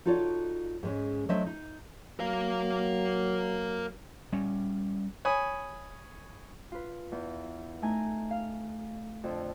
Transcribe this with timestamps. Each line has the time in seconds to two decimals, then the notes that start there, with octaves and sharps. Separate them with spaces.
0.05 D#4 F4 F#4 A4 C#5 D5
0.83 G#2 G#3 C#4
1.29 F#3 A3 D4 C5 D#5 E5
1.46 D#4
2.20 F#3 A#4 F5
4.33 G3 C#4
5.25 C#5 G#5 B5 D#6
6.72 F4 B4
7.12 E2
7.82 A3 D#4 G#5 A#5 G6
8.31 F5
9.24 F2 D3